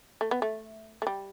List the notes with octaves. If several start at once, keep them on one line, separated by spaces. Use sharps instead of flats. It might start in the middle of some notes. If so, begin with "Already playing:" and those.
A3
B3
A3
A3
G3